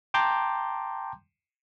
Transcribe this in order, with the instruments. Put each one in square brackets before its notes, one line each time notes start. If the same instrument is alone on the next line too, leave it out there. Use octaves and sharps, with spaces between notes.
[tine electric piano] G5 A5 A#5 C6 D6 G6